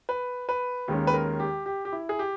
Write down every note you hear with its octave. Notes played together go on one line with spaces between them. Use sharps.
B4
B4
D#2 D#3 G#3 C#4
B4
A#4
G4
G4
G4
E4
G#4
G4